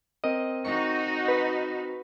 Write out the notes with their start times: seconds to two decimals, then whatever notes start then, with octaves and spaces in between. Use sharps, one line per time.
0.24 C4 A#4 D#5
0.65 D#4 F#4 C#6
1.28 B4